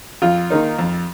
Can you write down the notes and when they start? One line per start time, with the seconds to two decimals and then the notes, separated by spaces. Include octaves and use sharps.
0.22 F2 F4
0.50 D#3 A#3 D#4
0.79 F2